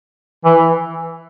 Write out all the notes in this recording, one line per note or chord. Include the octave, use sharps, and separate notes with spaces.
E3